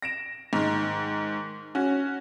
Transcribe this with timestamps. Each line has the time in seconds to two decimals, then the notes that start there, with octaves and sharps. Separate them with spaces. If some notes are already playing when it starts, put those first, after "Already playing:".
0.02 A#6 D7 E7
0.53 G#2 D#3
1.75 C#4 F#4